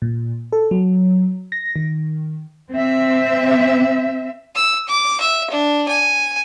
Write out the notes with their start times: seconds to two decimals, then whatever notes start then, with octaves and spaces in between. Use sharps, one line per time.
0.02 A#2
0.53 A4
0.71 F#3
1.52 A#6
1.76 D#3
2.72 C4 E5
4.55 E6
4.88 D6
5.20 E5
5.50 D4
5.88 G#5